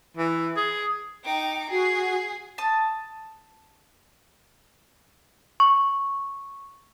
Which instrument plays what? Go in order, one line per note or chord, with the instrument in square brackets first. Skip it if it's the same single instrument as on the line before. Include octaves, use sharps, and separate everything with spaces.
[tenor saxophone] E3
G#4
[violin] D#4 D6 [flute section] G5
[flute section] F#4 [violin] G#4 C7
[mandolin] A5 D#6
[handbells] C#6